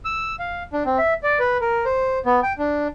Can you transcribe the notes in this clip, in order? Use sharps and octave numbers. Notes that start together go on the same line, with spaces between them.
E6
F5
D4
C4
E5
D5
B4
A#4
C5
B3
G5
D4